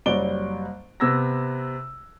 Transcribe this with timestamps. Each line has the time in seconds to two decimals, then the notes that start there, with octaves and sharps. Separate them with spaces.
0.06 F#1 F#3 G3 D5 D7 G7
1.00 C3 B3 E6 G#6 A#6